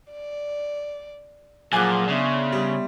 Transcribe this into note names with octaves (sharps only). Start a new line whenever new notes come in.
D5
A#2 F3 F#3 G#4 F#5 G#5 D6 F#6
C#3 B3 D4 E5 C6
G3